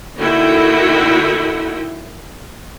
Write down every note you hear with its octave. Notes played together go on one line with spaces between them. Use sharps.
D3 A#3 D#4 E4 F#4 G5